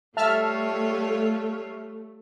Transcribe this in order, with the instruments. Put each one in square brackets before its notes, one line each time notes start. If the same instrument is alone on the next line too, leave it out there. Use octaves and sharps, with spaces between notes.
[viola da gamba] G3 F4 C#5 [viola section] A3 [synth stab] E5 A5 F6